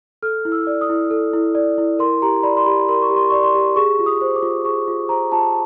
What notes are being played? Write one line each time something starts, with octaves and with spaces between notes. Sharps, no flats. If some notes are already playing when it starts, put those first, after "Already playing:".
A4 F6
E4
E6
D5
D#6
E4
A4
E4
D5
E4
A#4 C6
G4 A#5
D5 B5
C6
G4 B5
A#4 C6
C#6
G4
C6
D5 C#6
C6
G4
G#4 C#6
F4
D#6
C5
D6
F4
G#4 C#6
F4
C5 A#5
F4 A5